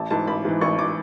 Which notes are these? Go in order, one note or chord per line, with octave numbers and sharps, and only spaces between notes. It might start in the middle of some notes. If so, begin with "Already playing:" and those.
Already playing: A1 A5
G#2 E3 A5
A1 B5
G#2 E3
A1 C#6
E3 D6